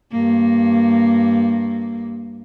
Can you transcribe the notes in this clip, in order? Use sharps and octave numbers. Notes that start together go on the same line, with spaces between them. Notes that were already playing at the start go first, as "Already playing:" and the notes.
G2 A#3